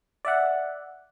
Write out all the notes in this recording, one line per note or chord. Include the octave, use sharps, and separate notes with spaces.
D5 E5 F#5